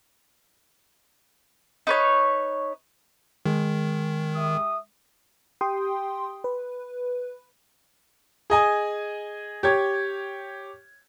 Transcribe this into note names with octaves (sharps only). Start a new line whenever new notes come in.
D#4 B4 C#5
D#3 G#3
G4 E5 D#6
G4 G5 C6 D#6
B4
G#4 D#5 G#5
G4 C#5 G#6